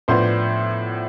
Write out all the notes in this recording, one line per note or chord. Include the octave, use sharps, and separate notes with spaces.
A2 F3 B3 D4 C5 C6